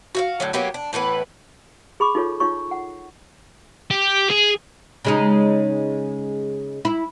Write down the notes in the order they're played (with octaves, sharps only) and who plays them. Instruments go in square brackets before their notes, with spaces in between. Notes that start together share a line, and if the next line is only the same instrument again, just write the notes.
[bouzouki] F#4 E5 F5
A2 D3 F#3
F#3 A#3 B3 G4
D4
A2 E3 B3 B4
[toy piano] G#4 B5 C#6 D6
D#4 F4 A4 C#5
D#4 F4 C#5 C#6
F#5
[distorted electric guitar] G4
G#4
[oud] C#3 G#3 D#4
E4